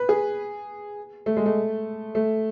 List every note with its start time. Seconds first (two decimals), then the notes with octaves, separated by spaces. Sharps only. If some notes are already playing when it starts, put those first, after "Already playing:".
Already playing: B4
0.09 G#4
1.26 A3
1.37 G#3
1.46 A3
2.15 A3